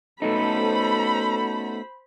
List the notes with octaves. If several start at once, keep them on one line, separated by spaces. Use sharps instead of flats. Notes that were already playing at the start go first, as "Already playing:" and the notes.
A3 B3 C#4 D#4 F#4 A4 C5 B5